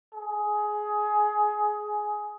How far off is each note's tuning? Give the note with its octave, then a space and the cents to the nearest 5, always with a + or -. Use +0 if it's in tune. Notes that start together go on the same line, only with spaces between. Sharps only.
G#4 +15